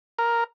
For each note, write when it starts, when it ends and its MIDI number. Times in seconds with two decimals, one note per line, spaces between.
0.19 0.44 70